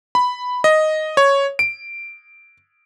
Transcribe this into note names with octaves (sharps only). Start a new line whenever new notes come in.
B5
D#5
C#5
D7